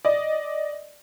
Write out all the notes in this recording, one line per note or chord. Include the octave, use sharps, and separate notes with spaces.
D5 D#5